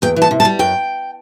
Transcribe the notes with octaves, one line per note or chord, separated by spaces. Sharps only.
E2 G5
E3
A5
C3
A5
G3
F#2 G5